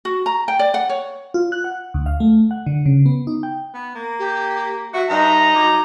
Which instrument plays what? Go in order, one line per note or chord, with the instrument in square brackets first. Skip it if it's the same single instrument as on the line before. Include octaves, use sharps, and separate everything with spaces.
[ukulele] F#4
A#5
G5
D5
F#5
C#5
[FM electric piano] F4
F#6
F#5
D2
F5
A3
F#5
D3
C#3
B3
D#4
G5
[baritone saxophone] B3
A#3
[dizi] G4
[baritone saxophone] F#4 [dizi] E5
[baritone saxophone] G2 [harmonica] D#4 A#5
[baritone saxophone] F#3 [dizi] D6